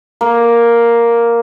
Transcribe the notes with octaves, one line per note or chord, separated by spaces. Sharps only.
A#3